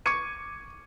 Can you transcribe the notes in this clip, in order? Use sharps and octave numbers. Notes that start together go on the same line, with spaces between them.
C#6 D6 G#6 C#7 D#7